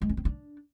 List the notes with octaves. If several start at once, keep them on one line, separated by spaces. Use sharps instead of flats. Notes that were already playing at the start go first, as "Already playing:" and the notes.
G#3
C#4
C4
D4